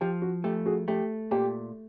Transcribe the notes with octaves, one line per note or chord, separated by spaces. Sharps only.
F3 G4
F#4
A3 G4
F#4 G#4
A3 G4
A#2 G4